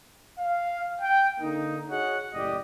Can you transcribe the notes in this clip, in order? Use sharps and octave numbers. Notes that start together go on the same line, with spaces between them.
F5
G5
D3 A#3 D#4
F#4 G#4 C#5 D#5 F#5
F#1 A2 G4 D5 D#5